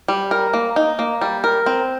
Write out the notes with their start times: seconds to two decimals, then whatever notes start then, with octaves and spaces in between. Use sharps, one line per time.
0.08 G3
0.31 A#4
0.54 A#3
0.76 D#4
0.99 A#3
1.21 G3
1.44 A#4
1.66 C4